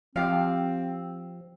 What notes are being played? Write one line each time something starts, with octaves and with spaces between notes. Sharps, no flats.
F3 C4 G4 F5